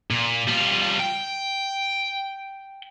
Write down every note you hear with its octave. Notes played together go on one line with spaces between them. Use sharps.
A#2
G3 F4
G5